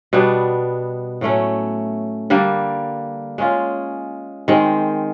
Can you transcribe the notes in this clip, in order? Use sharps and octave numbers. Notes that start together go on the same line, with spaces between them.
B2 G3 B3 D4
A2 F#3 A3 C#4
D3 G3 A#3
G#3 C#4 F4
D#3 G#3 C4